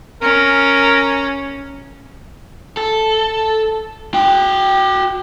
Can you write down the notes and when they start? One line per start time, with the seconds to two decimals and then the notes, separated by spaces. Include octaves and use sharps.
0.22 C#4 A#4
2.77 A4
4.14 F#4 G5